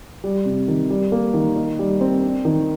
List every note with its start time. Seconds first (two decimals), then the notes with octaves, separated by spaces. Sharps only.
0.24 G3
0.45 C3
0.68 D#3
0.90 G3
1.12 A#3
1.34 D#3
1.56 D#4
1.79 G3
2.01 C4
2.23 D4
2.45 D#3